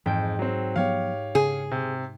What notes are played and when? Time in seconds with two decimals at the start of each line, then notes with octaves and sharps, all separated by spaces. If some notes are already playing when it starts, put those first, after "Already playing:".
0.06 F2 G#2 E3 G5
0.39 F#3 C4
0.76 F3 F#3 B3 G4 C#5 F5
1.35 C#3 G#4
1.71 C3